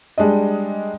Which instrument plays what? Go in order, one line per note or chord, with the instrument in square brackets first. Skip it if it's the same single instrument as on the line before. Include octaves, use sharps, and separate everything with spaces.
[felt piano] G3 G#3 D4 D#5